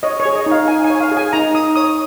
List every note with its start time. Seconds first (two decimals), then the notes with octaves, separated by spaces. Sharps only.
0.03 C#5 D#5
0.20 C#5
0.25 G#4
0.35 D#5
0.46 D#4
0.52 F5
0.68 D#4 G#5
0.84 G#5
0.90 C#5
1.00 F5
1.12 G#4
1.17 G#5
1.33 D#4 A#5
1.54 D#4 D#6
1.76 C#5 D#6